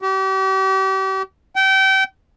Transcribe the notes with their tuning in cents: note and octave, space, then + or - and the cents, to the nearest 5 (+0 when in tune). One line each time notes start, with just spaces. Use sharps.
G4 -40
G5 -30